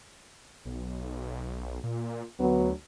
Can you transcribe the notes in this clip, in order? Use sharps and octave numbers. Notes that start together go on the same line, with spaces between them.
B1
A#2
D2 F#3 B3